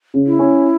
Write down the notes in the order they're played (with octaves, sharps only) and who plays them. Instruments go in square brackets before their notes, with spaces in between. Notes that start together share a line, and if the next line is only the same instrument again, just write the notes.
[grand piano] C#3
[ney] E4
[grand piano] C#4